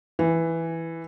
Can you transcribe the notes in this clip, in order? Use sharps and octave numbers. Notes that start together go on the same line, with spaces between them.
E3